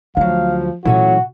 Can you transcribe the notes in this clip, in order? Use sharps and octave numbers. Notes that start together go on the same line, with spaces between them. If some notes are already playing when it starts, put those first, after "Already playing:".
D2 F3 F#3 A3 F4 F5
A#2 E3 F#3 A3 C#4 F#4